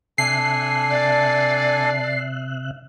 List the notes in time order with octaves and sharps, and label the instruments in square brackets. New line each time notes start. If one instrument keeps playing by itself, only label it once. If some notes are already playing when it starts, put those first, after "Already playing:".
[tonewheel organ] C3 E5 F#6 [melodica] D4 A4 G#5 [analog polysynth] C7
[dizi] D5